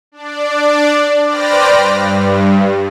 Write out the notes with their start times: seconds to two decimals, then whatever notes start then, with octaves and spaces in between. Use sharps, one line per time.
0.12 D4 D5
1.26 B4 C5 D5 G5 F6 A#6
1.74 G2